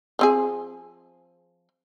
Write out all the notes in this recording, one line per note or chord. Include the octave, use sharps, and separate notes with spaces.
F3 C4 G#4